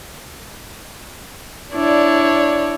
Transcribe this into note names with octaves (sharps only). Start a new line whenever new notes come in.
D4 E4 C#5 D5